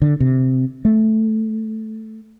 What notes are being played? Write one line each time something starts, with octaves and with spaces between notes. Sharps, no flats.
D3
C3
A3